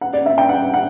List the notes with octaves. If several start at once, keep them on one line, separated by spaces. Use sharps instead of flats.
F#5
D5
E5
G5
F#5
F#5